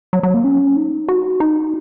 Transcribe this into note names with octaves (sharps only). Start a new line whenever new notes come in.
F#3
F#3
A#3
C#4
D#4
F#4
D#4